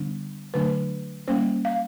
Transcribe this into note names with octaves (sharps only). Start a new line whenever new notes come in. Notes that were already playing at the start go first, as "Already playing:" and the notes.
Already playing: D3 G3 B3 D4
D3 F#3 A3 D4 B4
G3 A#3 C#4 C5
F5